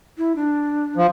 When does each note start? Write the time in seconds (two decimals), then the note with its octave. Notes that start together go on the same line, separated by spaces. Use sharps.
0.18 E4
0.36 D4
0.97 F3